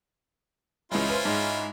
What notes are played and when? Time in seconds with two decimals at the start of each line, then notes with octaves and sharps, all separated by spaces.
0.92 C#2 E3 G#3 C#4 E4 F4
1.10 B4 C5
1.25 G#2 G#3